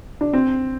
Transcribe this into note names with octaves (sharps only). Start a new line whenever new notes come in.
D4
C4